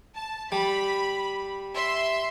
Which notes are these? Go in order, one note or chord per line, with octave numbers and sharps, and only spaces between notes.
A5
G3 B5
E5 C6